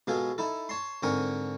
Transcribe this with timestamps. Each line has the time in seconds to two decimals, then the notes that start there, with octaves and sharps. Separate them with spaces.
0.07 B2 G#3 F4 G#4 A4
0.38 D#4 E4 A4
0.69 C#5 A5 C6
1.03 G#2 D3 C4 A#4 G#5 C#6